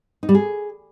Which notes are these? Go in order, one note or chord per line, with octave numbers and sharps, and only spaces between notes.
D#4
G3
G#4